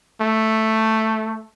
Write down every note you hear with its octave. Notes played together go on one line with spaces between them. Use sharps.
A3